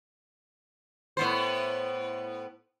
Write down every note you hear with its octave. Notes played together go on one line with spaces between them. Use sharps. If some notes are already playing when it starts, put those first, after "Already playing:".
A2 B3 C5